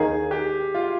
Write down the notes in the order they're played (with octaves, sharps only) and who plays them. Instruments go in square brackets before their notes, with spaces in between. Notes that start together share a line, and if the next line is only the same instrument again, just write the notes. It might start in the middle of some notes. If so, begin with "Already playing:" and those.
Already playing: [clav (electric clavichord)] D#2 D#3 A#3 D#4 A#4 [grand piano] G#4
[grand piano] G4
F4